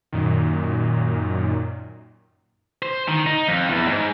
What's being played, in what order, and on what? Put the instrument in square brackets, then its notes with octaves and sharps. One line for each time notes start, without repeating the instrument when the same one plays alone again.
[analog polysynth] F#2 A#2 D#3
[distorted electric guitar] C5
D#3
D#4
F2
E2
G#2